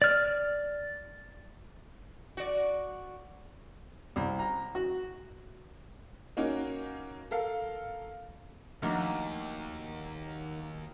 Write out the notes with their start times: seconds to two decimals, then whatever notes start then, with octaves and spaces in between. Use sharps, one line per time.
0.02 D5 F6
2.37 F#4 D5
4.16 C2
4.39 A#5
4.75 F#4
6.37 A#3 C#4 D#4 F#4 A#4
7.31 A4 A#4 F5
8.82 D#2 D#3 F3 F#3 A3 A#3 D4